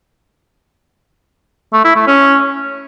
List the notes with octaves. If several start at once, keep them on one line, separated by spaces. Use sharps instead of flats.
A3
E4
A3
C#4